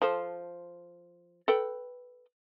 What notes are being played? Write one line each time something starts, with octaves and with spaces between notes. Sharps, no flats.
F3 A4 C5
A4 B4 G5